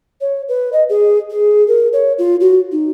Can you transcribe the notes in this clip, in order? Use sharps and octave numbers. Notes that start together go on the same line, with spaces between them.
C#5
B4
D#5
G#4
G#4
A#4
C#5
F4
F#4
D#4